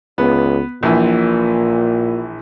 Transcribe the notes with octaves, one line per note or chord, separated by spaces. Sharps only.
C#2 B3
A#1 A#2 E3